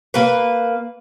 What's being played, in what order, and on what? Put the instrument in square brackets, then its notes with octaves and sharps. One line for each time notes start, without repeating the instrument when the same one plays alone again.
[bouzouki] A#3 B4